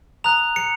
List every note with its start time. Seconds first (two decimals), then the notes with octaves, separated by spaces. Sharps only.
0.24 A#5 D#6 F#6 F7
0.56 C#7